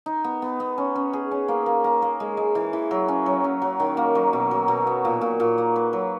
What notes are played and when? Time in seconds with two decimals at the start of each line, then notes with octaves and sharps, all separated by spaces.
0.06 D#4
0.24 B3
0.42 B3
0.60 B3
0.78 C#4
0.95 C#4
1.13 G#4
1.31 C#4
1.48 A#3
1.66 A#3
1.84 A#3
2.02 A#3
2.20 G#3
2.37 G#3
2.55 E3
2.73 E3
2.91 F#3
3.08 C#4
3.26 F#3
3.44 C#4
3.62 F#3
3.80 D#3
3.97 A#3
4.15 F#3
4.33 B2
4.51 F#3
4.68 B2
4.87 B3
5.05 A#2
5.21 A#2
5.40 A#2
5.58 A#3
5.76 B4
5.93 F#3